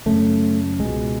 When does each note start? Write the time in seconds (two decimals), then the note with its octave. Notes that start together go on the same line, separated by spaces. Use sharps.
0.06 F#2 C#3 A3
0.79 C#2 G#3
0.85 B2